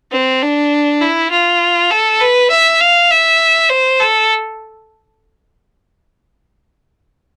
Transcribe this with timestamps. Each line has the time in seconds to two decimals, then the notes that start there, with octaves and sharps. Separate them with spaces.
0.12 C4
0.42 D4
1.02 E4
1.31 F4
1.91 A4
2.20 B4
2.50 E5
2.81 F5
3.11 E5
3.70 C5
4.00 A4